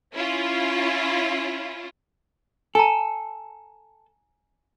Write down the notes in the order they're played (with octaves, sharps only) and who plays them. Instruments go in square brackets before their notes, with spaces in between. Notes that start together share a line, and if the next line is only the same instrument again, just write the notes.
[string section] C#4 E4 F4
[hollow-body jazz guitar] A4 [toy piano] G#5 A#5